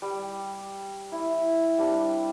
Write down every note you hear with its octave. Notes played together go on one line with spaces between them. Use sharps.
G3
E4
G3 C4 D4